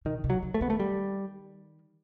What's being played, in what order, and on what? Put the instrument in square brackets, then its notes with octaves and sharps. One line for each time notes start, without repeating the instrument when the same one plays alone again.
[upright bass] B2 [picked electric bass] D#3
[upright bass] C3
[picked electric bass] F#3
[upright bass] D#3
[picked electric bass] A3
[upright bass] D#3 [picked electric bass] B3
[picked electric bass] A3
G3